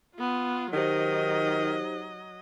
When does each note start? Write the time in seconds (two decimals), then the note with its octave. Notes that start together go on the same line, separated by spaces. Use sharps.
0.16 B3 F4
0.73 D#3 F#3 D#4 G4 C5 D#5